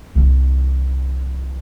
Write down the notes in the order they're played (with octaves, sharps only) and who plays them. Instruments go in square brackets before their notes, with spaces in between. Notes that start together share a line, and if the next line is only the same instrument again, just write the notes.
[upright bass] C2 E3